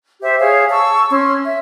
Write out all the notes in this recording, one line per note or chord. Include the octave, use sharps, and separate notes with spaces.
G4 C5 E5
G#4 C#5 F5
A5 C#6 E6
C#4 C6
E5